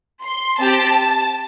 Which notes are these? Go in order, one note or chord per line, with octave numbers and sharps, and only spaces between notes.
C6
C4 G4 A5